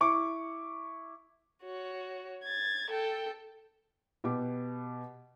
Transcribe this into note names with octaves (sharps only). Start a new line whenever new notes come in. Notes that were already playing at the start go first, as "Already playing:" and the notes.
E4 C#6 D6
F#4 C#5
G#6 A6
A4 G5
B2 B3 G4 D6